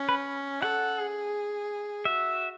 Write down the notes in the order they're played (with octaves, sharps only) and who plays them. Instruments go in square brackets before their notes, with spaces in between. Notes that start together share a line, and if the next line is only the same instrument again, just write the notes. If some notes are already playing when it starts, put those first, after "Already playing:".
Already playing: [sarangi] C#4
[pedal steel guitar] B4
[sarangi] A4 [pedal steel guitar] F#5
[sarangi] G#4
[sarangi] F#4 [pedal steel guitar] E5